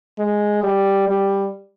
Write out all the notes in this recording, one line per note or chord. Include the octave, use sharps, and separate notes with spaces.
G#3
G3
G3